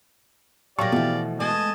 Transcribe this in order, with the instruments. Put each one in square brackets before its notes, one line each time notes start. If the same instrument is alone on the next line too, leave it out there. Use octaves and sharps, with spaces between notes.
[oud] A#2 F#3 [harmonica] G4 D5 F5 [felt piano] C#6 A#6
[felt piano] B2 E3 [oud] F3 A3
[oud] G#3 A3 B3 [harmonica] D#5 G#5 A5